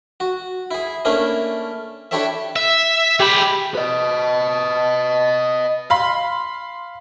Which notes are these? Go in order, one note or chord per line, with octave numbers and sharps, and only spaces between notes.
F#4
E4 G#4
A3 A#3 C#4 D4 E4
D4 E4 G4 A4 C#5 E5
E5
G#3 G4 B5
B4 D#5
F5 B5 C6